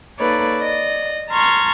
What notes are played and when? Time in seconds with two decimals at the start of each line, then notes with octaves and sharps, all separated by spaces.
0.19 A#3 D#4 A4 B4 C#5 D5
0.59 D5 D#5
1.29 A5 A#5 C6 C#6 F6 G#6